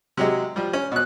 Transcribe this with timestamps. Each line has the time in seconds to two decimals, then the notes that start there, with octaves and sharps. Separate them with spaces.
0.17 C3 F#3 G#3
0.56 F3 G3
0.73 C#4
0.92 B2 F#6